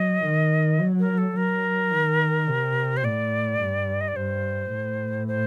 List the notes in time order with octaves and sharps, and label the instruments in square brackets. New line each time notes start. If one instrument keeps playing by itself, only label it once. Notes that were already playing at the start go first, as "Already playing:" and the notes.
Already playing: [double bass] F#3 [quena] D#5
[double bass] D#3
F#3
[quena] A#4
A4
[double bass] F#3 [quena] A#4
[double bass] D#3
C3
[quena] C5
[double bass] A2 [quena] D5
[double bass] G2
[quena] D#5
D5
[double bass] G2 [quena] C5
[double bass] A2
[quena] C5